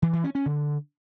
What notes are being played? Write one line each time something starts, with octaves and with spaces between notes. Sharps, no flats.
E3
E3
C#4
C#4
D3